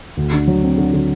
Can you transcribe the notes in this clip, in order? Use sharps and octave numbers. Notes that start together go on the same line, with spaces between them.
D2
D3
F#3
C4
D3
D3